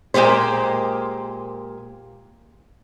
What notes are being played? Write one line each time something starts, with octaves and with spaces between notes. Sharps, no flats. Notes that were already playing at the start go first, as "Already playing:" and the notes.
A#2 G#3 A#3 G4 C5